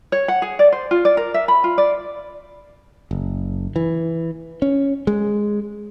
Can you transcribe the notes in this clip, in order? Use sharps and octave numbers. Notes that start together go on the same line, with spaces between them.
C#5
F#5
G#4
D5
C5
F4
D5
A#4
E5
B5
F4
D5
F#1
E3
C#4
G#3